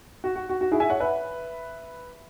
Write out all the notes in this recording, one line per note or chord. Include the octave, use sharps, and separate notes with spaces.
F#4
F#4
F#4
F#4
E4 G#4
E5 G#5
C#5 F#5
B4 E5